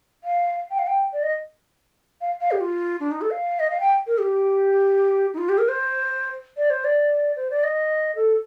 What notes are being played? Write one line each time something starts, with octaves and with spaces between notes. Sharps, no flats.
F5
G5
F5
G5
D5
D#5
F5
F5
G4
F4
D4
D#4
A4
F5
D#5
F5
G5
A#4
G4
D#4
F4
G4
A#4
C5
D5
C5
D5
C5
D5
D#5
A4